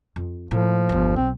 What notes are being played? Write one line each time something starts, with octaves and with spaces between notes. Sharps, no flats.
F2
A2 F3 A#3
G1 E2
B1 C4